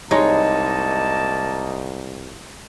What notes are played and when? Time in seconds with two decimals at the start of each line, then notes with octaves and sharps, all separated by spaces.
0.11 C2 G#3 A#3 D#4 C#5 D#5 A5